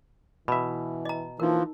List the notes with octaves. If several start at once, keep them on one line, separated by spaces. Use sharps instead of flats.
B2 E3 E5 B5
D#5 A#5
E3 F3 A#3 D#4 A#4